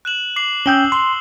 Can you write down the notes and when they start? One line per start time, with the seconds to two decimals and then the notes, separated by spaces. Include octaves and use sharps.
0.05 F#6 E7 F#7
0.36 D6 C7 F#7
0.66 C#4 G5 D#6 E6 G6 G7
0.92 C6